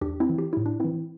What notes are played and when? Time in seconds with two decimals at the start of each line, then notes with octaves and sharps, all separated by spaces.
0.01 E2 D4 G4
0.20 C4 E4
0.29 E3
0.38 G4
0.53 A2 E4
0.66 D4
0.80 E3 C4 E4